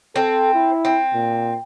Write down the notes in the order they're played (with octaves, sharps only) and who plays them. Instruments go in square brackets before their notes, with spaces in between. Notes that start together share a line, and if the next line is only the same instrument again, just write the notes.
[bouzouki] C4 [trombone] A4
[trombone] E4
[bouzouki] C4
[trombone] A#2